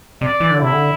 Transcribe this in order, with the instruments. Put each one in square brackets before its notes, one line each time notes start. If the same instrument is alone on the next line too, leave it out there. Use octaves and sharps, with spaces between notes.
[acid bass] C3 [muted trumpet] D5
[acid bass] E3
D3
[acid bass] C3 [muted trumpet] E4
[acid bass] D3